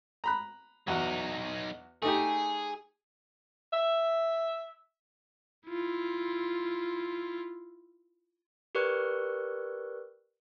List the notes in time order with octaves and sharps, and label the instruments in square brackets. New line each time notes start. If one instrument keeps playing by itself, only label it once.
[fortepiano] A#5 B5 F#6
[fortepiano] E2 F#4 [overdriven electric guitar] F#3 D#4
[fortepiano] A3 D#4 G4 [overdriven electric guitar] G#4
[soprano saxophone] E5
[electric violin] E4 F4
[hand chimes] G4 A#4 B4 D5 C#6 F#6